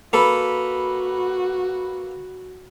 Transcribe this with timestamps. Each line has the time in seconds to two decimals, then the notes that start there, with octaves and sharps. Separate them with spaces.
0.13 A#3 F#4 A4 B4 B5